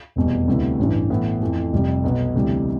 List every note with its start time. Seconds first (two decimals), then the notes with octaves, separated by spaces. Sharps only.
0.16 F1 E2 B2 G3
0.48 D2 C3 G3 B3 E4
0.79 A1 G2 E3
1.10 A2 E3 B3 E4
1.41 F2 E3 A3
1.73 F1 F2 C3 G3
2.04 B1 B2 B3
2.35 D2 C3 E3 G3